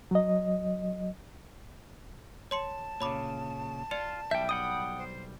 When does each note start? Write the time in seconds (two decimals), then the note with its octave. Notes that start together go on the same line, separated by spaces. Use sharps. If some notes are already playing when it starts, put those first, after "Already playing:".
0.11 F#3 D#5
2.51 C#5 A5 C6 C#7
3.01 A#2 C#3 C#5 B5 D6
3.91 F4 D5 C#7 F7
4.31 B1 G3 E5 G5 G6
4.49 F#5 G5 B5 D#6 D#7
4.98 C5